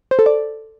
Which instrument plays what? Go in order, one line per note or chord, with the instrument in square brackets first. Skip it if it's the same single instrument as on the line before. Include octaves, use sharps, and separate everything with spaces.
[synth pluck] C5
A4
D5